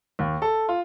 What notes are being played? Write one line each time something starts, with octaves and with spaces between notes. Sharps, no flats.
D#2
A4
F4